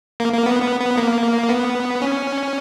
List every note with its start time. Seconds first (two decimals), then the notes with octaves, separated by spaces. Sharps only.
0.20 A#3
0.33 A#3
0.46 B3
0.62 B3
0.80 B3
0.97 A#3
1.49 B3
2.02 C#4